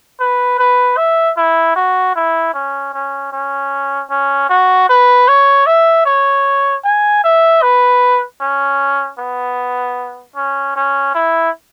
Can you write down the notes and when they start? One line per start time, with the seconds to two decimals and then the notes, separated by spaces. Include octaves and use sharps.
0.20 B4
0.59 B4
0.97 E5
1.37 E4
1.76 F#4
2.15 E4
2.54 C#4
2.94 C#4
3.32 C#4
4.10 C#4
4.49 F#4
4.89 B4
5.28 C#5
5.66 E5
6.06 C#5
6.84 G#5
7.24 E5
7.62 B4
8.41 C#4
9.19 B3
10.36 C#4
10.76 C#4
11.15 E4